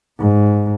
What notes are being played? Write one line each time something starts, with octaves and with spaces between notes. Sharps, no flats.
G#2